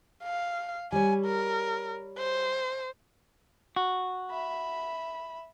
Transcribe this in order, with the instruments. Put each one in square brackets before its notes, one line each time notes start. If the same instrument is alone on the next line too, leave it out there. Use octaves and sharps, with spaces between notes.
[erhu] F5
[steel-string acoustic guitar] G3 C#5 [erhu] G#5
[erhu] A#4
C5
[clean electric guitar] F#4
[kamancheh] E5 B5